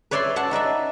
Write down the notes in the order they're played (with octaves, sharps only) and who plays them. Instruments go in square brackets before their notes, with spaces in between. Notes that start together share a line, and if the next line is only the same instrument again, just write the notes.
[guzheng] B4 C#5 D5 E5 B5 C6
E5 F#5 A5
D#4 B4 D5 E5